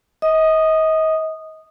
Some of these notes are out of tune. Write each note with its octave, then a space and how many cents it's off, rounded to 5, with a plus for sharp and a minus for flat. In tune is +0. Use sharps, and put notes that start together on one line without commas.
D#5 +35 D#6 -10